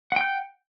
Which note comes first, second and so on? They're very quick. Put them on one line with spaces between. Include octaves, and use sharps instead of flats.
F#5 G5 G6